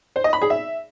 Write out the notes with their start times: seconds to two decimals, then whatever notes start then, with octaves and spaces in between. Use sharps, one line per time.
0.16 C5
0.24 D#5
0.33 B5
0.42 G#4
0.50 E5